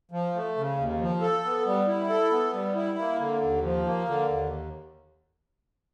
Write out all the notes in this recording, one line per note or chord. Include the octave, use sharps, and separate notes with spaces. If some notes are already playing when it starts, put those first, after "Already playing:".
F3
A3
C#3
D#2
F3
A4
B3
G3
E4
A4
B3
G3
E4
A#3
D3
D#2
F3
A#3
D3
D#2